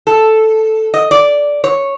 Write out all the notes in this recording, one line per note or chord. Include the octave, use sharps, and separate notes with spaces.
A4
D#5
D5
C#5